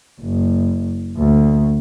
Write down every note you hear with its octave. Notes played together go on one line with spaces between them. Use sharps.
F#1
D2